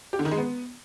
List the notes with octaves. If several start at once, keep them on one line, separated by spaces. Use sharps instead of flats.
G4
D3
D#3
G#3
B3